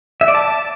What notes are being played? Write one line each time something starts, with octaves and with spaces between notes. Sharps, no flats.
E5
D5
A5